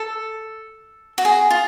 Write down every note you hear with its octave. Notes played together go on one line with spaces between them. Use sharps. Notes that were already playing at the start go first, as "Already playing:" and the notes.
Already playing: A4
F#4
G#4
F4